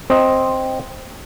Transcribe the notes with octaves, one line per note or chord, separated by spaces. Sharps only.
C4 D#5